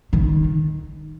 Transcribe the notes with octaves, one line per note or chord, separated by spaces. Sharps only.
D#3